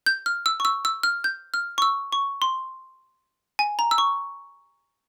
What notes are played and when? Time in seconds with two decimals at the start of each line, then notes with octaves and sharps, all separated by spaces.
0.06 G6
0.26 F6
0.46 E6
0.60 C#6
0.65 E6
0.85 E6
1.03 F6
1.24 G6
1.54 F6
1.78 C#6
1.82 E6
2.13 C#6
2.42 C6
3.59 G#5
3.79 A#5
3.91 E6
3.98 C#6